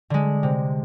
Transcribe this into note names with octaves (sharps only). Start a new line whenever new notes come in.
D3 G#3
C3